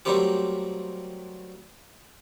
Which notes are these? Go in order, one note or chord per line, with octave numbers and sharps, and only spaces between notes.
F#3 G3 A3 A#3 C4 G4